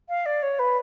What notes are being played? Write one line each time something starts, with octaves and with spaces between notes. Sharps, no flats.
F5
D5
C#5
B4